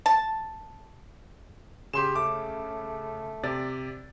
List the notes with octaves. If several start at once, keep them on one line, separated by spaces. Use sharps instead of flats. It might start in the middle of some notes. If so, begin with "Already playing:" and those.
A5
C#3 G4 G#4 C6 E7
A3 D6
C3 D5 A6